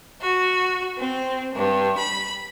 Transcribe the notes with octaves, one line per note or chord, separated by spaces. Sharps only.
F#4
C4
G2
B5